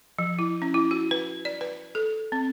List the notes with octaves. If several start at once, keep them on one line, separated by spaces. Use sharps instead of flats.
F3
E4
C#4
E4
F#4
B4
D5
B4
A4
C4